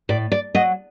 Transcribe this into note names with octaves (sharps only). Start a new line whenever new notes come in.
A2 D5
D5
F#3 D#5